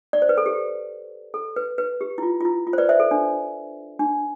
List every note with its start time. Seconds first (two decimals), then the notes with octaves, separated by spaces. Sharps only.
0.13 D5
0.22 C5
0.29 B4
0.38 A4
0.46 G4
1.34 A4
1.56 B4
1.78 B4
2.01 G4
2.18 E4
2.23 F4
2.41 F4
2.45 E4
2.67 F4
2.73 C5
2.78 B4 D5
2.89 C5 E5
3.00 A4
3.11 D4
3.99 D4